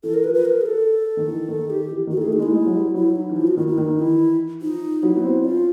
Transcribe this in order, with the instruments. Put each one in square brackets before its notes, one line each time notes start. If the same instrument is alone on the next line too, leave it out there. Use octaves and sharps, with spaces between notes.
[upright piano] E3 [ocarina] A4
[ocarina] A#4
[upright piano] F3 [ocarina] B4
[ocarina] B4
A#4
G#4
A4
[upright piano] D#3
E3
D#3
[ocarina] G4
[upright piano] E3
D#3
[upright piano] E3 [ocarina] F#4
[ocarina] A4
[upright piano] A3 [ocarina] G#4
[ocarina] D#4
[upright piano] G#3 [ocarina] E4
[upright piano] G#3
F#3
G3
[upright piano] F#3 [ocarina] E4
[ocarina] D#4
[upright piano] E3
[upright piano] F3 [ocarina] E4
[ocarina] F#4
[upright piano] D#3 [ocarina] E4
[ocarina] E4
[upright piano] D#3 [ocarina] D#4
[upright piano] E3 [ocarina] E4
[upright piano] F3 [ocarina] D#4
[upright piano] F#3 [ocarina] E4
[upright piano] B3
C4
[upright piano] C#4 [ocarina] F4